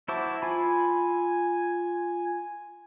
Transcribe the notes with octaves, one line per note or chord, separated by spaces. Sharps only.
E4 F#4 C5 E5 A5 D6
F4 G#5 B5